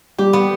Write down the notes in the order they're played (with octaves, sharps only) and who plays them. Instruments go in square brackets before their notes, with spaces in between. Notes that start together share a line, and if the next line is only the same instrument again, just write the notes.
[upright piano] G3 [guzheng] G4
[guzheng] B3